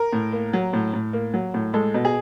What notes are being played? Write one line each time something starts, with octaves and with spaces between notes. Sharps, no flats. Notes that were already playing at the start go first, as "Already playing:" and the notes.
Already playing: A#4
A2
A#3
F#3
A2
A2
A#3
F#3
A2
G#3 A4
B2
G#4